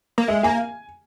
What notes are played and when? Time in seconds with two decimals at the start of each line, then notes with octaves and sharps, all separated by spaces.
0.18 A#3
0.28 G#3 E5
0.43 A#3 G#5